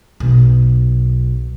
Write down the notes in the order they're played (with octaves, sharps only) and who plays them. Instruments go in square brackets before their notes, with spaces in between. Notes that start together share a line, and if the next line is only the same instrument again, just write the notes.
[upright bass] B1